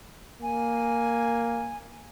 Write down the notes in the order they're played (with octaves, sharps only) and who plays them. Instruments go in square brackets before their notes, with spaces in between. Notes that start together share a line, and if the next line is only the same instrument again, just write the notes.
[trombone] A#3 [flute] G#5